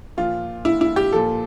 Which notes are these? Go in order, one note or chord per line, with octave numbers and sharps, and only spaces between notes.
A#2 F3 F4
E4
E4
G4
A#2 F3 A4